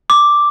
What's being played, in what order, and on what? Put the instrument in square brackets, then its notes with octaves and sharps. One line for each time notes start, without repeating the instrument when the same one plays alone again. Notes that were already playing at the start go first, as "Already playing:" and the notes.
[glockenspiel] D6